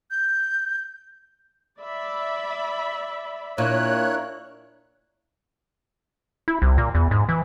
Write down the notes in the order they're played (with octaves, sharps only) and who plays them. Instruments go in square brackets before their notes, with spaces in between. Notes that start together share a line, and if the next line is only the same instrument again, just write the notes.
[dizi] G6
[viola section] D5 E5 B5
[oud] A#2 [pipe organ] D4 E4 A#4 [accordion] C#5 F#6
[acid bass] E4
C2
A#2
E2
G#2
E3